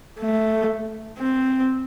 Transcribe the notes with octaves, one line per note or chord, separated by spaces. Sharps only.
A3
C4